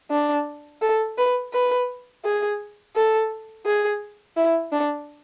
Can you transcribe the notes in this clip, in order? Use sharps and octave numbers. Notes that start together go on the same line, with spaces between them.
D4
A4
B4
B4
G#4
A4
G#4
E4
D4